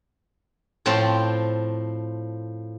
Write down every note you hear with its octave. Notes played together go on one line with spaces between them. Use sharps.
A2 F3 C4 A5